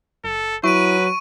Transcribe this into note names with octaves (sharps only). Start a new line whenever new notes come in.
F#1 A4
F#3 E4 B4 C#6 D7 D#7